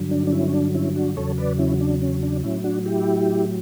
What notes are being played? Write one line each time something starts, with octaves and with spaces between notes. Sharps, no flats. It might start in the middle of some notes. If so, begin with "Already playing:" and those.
Already playing: G2 D3 F#3
D4
D4
C#4 E4
C#4
D4
C#4 E4
D4 F#4
E2 C#3 F#3 A4 C#5
B4 D5
C#4 E4
D4
C#4
D4
A2 F#3 C#4 E4
D4 F#4
E4 G4